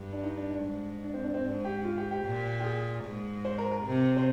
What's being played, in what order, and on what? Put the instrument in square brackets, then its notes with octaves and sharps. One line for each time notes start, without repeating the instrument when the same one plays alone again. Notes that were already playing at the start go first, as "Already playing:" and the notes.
Already playing: [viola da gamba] G2
[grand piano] D4
D#4
D4
D4
[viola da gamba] G#2
[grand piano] D4
C4
D4
C4
[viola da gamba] G#2 [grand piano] D4
[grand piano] G4
F4
G4
G4
[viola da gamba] A#2
[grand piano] G4
G#4
[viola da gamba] G#2
[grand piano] C5
A#4
A#4
[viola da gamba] C3
[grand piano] C5